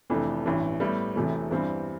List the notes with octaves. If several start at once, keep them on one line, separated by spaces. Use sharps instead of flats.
F1 F2 E3 A3 D4
A1 G2 E3
A2 G3 B3 E4
E1 E2 C3 E3 A3
G2 E3 G3 C4